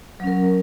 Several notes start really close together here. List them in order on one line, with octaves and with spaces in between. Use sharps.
F#3 C#4 A#4